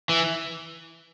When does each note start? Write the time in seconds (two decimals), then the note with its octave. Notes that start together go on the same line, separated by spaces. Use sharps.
0.09 E3